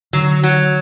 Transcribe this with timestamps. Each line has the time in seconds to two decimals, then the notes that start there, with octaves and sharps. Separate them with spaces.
0.13 D3 F#3
0.43 F#3